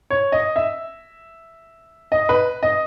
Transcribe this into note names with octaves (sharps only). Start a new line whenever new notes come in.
C#5
D#5
E5
D#5
B4
D#5